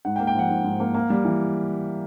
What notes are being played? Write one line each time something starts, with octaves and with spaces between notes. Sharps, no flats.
G#2 F#5
G5
A#3
G5
F3 F#5
G#2
G#2
A#3
A#3
G3
E3